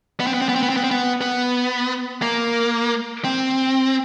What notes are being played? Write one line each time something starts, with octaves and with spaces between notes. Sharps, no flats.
B3
C4
B3
C4
B3
C4
B3
C4
B3
C4
B3
B3
A#3
C4